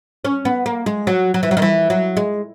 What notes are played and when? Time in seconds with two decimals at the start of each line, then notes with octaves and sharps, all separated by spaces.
0.25 C#4
0.45 B3
0.66 A#3
0.86 G#3
1.07 F#3
1.34 F#3
1.43 E3
1.51 F#3
1.57 D#3
1.62 E3
1.90 F#3
2.17 G#3